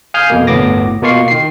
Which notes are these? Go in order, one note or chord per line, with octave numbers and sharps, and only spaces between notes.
F5 G#5 D#6 F6 G6 C7
F2 B2 A#3
G1 D2 A2 B3 D6 A#6
B2 A#3 F4 C#6 C7
D#3 C7